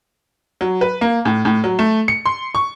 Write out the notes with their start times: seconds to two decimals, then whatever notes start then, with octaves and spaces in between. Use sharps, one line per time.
0.61 F#3
0.81 B4
1.01 A#3
1.25 A2
1.45 A2
1.64 F#3
1.79 A3
2.08 C#7
2.26 C6
2.55 C#6